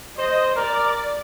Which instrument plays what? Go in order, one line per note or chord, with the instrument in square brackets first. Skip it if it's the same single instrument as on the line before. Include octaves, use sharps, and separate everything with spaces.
[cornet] C5 [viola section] D#5
[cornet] A#4 [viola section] D5